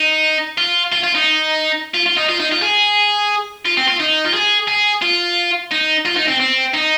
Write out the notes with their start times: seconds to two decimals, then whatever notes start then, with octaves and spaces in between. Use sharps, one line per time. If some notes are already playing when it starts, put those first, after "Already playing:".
Already playing: D#4
0.58 F4
0.92 F4
1.04 F4
1.15 D#4
1.94 F4
2.06 F4
2.17 D#4
2.29 F4
2.40 D#4
2.52 F4
2.63 G#4
3.66 F4
3.77 C4
3.88 F4
4.00 D#4
4.25 F4
4.33 G#4
4.68 G#4
5.02 F4
5.71 D#4
6.05 F4
6.16 D#4
6.28 C4
6.40 C4
6.74 D#4